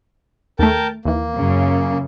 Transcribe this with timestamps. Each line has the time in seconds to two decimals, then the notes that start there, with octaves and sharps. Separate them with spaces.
0.59 D#2 A3 A#4 G5 A5
1.05 D#2 E3 A#3
1.36 F#2 C#3